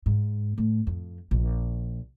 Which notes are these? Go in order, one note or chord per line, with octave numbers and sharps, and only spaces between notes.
G#2
A2
F2
A#1